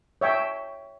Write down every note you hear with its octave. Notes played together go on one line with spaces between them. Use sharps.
C#5 E5 G5